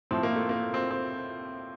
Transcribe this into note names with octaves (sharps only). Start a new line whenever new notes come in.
A2 F3 C4
A#3
A3
A#3
C4
C4